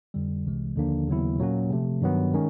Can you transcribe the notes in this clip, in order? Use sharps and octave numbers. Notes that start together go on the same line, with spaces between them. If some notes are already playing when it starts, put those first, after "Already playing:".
F2 D3 G3
C2 C3 E3 G#3
D#2 D3 F3 A#3 D4
D#2 C#3 F#3 B3 E4
A#2 F#3 A#3 C#4 F#4
C3 F3 A3
G2 D#3 F#3 B3
D#3 G#3 C#4